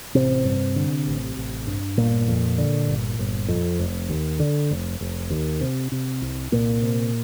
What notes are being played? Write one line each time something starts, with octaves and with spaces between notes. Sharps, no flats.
A1 C3 C4
G2
D3
A1
A1
G2
G1 A#2 A#3
F2
D3
G1
G1
F2
F1
D#2
D3
F1
F1
D#2
C3
C3
C2
C2 A#2 A#3
C3